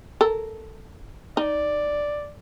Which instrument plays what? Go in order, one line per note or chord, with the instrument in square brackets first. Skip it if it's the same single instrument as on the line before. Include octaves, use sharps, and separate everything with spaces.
[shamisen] A4 A#4
[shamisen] D#4 [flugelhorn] D5